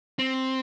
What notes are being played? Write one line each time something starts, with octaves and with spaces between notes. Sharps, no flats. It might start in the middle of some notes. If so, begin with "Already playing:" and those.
C4